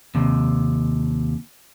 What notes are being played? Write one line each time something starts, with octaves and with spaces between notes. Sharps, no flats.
D#2 C3